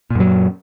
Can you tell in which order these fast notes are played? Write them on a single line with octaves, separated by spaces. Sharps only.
A#2 F#2 F#3